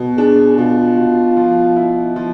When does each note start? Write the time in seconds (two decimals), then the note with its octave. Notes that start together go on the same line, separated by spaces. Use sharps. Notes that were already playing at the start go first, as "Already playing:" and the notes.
Already playing: B2
0.18 D4 G#4
0.58 B2 F4
0.97 B2
1.37 F3
1.76 E4
2.16 F3